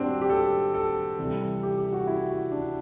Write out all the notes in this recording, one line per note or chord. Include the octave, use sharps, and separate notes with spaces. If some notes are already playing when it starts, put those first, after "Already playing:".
Already playing: A2 G3 C4 D4 F#4 G4
G4
A4
A4
C3 E3 G3
G4
G4
F#4
E4
F#4
D4